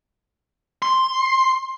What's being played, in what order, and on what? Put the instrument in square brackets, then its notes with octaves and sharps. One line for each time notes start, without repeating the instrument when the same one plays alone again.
[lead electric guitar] C6